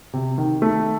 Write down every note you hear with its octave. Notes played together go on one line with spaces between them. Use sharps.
C3
D#3
A3